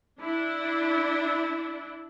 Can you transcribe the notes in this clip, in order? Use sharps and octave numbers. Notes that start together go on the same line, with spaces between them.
D4 E4